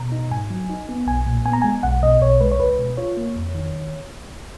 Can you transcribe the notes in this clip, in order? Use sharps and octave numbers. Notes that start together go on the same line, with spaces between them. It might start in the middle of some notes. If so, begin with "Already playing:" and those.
Already playing: B2 A#5
D#4
G#2 G#5
F#3
D#4
B3
B1 G#5
A#2
B3 G#5
A#5
G#3 G#5
B1 F#5
B2 D#5
B1 C#5
G#3 B4
C#5
C#2 B4
B2
F4 C#5
A#3
F2
D#3